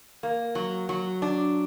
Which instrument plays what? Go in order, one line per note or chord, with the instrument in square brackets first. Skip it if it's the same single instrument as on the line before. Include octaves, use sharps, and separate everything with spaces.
[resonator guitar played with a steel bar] A#3
F#3
F#3
D4